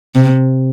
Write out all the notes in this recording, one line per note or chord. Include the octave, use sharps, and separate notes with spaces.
C3